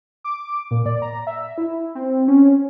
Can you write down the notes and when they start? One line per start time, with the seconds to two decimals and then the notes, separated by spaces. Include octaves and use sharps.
0.24 D6
0.71 A#2
0.86 D5
1.02 A#5
1.27 E5
1.58 E4
1.95 C4
2.28 C#4